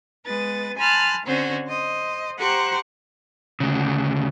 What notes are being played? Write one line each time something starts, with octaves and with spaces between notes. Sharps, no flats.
G#3 B3 B4 A6
G#5 A5 B5 C6 F6 F#6
D3 C4 C#4 F#4 C5 C#5
C5 D#5
G4 C5 F#5 A#5 C#6 F#6
D2 C#3